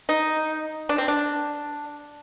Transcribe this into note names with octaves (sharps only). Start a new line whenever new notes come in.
D#4
D4
C4
D4